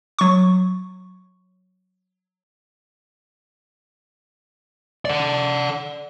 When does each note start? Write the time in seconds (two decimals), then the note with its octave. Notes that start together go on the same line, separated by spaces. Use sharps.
0.19 F#3 C#6
5.05 D5 F#5